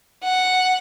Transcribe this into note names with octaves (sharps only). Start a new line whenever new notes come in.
F#5